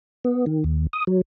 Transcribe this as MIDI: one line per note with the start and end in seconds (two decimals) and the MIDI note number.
0.25 0.45 59
0.46 0.64 51
0.64 0.87 39
0.93 1.04 87
1.07 1.21 54